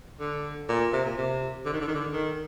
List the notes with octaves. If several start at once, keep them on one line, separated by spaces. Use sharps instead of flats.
D3
A#2
C3
A#2
C3
D3
D#3
D3
D#3
D3
D#3